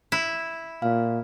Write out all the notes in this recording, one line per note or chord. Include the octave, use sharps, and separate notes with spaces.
E4
A#2 F5